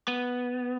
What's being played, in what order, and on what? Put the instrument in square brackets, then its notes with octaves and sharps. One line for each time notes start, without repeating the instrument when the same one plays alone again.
[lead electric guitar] B3